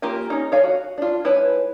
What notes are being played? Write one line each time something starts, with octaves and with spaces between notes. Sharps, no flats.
A#3 F4 G4 A#4 G#5
C#4 D#4
C#5 F5 G#5
F#4
D4 F4
G#3 E4 B4 C#5 G#5